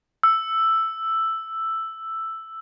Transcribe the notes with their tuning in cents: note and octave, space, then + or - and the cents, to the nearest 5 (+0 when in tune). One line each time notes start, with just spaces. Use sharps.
E6 +5